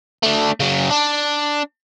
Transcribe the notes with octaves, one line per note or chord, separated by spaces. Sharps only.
A3 D4
C#3 F#3
D4